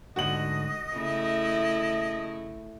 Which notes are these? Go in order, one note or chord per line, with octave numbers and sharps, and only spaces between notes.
D2 G#2 D3 F#4 D#5 F#7
C#3 A3 E4